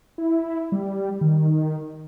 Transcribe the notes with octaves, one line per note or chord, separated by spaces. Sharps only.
E4
G3
D#3